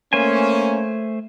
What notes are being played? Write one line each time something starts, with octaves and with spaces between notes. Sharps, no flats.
A3 A#3 C#4 C5 G#5